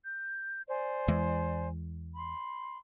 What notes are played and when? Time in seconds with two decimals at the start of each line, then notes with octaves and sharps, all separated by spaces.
0.03 G6
0.68 C5 D5 G#5
1.08 E2 E3 G#3
2.15 B5 C6